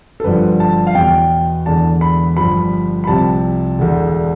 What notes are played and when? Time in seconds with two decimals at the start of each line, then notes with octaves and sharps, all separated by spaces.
0.20 A4
0.24 G1 G2 D3 F3 B4
0.60 A5
0.87 F5
0.95 E2 B2 G5
1.66 E1 E2 D3 A5
2.01 B5
2.37 G1 G2 F3 B5
3.04 B5
3.07 C2 C3 F3 A5
3.79 E1 D2 D3